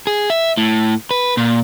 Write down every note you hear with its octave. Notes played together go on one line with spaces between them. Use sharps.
G#4
E5
A2
B4
A#2